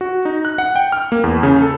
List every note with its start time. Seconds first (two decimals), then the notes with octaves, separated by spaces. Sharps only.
0.01 F#4
0.25 D#4
0.45 F#6
0.58 F#5
0.76 G5
0.92 F6
1.12 A#3
1.24 E2
1.43 C#3
1.62 A4